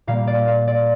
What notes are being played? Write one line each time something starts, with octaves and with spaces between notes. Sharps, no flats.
A#2 G3 A#3 F5
D5
F5
D5